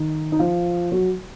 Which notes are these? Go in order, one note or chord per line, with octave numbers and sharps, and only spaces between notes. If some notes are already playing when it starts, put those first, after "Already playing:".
Already playing: D#3 D#4
D#4
F3 F4
F#3 F#4